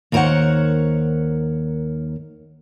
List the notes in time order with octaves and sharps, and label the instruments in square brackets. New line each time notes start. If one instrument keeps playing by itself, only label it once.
[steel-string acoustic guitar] D#2 D#4 A#4 C5 C#5 F#5